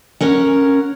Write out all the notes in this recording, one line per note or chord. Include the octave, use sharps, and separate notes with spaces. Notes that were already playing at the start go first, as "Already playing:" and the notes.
C#4 A#4 F#5